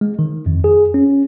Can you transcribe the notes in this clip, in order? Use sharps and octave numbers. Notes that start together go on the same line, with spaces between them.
G#3
D#3
F2
G#4
C#4